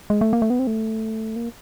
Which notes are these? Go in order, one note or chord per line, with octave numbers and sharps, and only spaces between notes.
G#3
A3
A#3
A3
B3
C4
A3
A#3